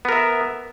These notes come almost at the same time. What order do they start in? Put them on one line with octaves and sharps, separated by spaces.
B3 A#4 E5